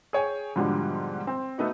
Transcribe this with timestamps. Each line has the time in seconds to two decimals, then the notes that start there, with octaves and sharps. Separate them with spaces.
0.13 G#4 C#5 G5 G#5
0.56 G#2 B2 D3 F3 G3 D4
1.27 C4
1.58 A3 B3 D#4 F#4